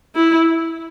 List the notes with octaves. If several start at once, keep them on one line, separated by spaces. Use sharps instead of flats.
E4